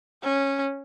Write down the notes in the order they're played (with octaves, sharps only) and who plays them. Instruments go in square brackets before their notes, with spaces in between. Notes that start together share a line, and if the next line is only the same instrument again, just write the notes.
[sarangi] C#4